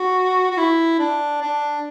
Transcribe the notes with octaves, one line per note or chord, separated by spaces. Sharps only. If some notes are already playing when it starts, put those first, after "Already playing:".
Already playing: F#4
F#4
E4
D4
D4